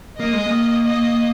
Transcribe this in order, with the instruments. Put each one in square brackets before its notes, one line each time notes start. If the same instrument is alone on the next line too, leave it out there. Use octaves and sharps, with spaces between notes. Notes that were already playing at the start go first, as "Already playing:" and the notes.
[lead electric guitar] A#3 [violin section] D#5
[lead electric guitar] G#3
A#3
[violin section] D#5